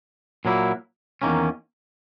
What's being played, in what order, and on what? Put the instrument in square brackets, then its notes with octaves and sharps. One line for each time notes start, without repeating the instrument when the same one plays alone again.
[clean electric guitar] A#2 F#3 A#3 E4
E2 D#3 A#3 C#4